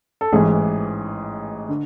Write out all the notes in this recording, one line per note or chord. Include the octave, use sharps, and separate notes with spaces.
A4
A1 G#2 E3 G#4
D3